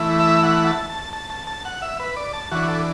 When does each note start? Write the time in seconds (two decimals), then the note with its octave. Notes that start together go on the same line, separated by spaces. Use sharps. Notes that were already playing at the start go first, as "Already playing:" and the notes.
Already playing: E3 A3 E4
0.20 E5
0.43 F#5
0.67 A5
0.90 A5
1.13 A5
1.30 A5
1.47 A5
1.65 F#5
1.82 E5
2.00 B4
2.17 D5
2.33 A5
2.51 E3 D4 F#4
2.68 A4